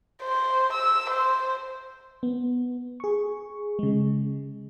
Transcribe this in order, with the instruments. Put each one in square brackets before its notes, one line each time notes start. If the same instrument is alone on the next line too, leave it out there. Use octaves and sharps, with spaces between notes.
[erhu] C5
E6
C5
[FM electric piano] B3
G#4 C#6
C#3 G#3